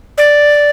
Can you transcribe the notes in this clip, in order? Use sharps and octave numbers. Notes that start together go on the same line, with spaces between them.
D5